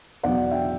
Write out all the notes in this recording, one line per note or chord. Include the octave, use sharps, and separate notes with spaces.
E2 B2 F#3 D5 F#5
E5 G5